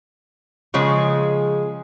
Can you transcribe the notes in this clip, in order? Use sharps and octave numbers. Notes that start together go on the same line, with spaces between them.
C#3 F3 G#3